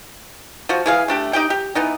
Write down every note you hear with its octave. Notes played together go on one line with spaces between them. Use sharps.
F3 F#4
E3 G#4 F5
A3 D4 G4
D#4 G4 G5
G4
E3 B3 D#4